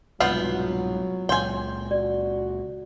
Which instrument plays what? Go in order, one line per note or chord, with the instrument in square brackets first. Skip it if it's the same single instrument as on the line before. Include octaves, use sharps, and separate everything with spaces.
[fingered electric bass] C2 G#2 B2 [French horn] F#3 [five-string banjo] B3 F4 G5
[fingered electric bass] C#2 A#2 C#3 [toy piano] C#5 C6 [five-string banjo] G5 G#5
[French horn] F#4 [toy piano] D5